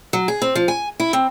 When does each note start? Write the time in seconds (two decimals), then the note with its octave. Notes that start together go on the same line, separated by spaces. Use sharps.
0.13 F#3
0.28 G#4
0.42 C4
0.55 F3
0.68 G#5
1.00 E4
1.13 C4